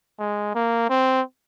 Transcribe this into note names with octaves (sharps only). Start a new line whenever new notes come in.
G#3
A#3
C4